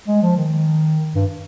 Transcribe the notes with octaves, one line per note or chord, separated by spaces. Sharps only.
G#3
F3
D#3
G2